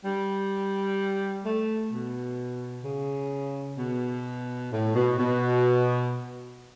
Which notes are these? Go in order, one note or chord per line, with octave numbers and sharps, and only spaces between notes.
G3
A3
B2
C#3
B2
A2
B2
B2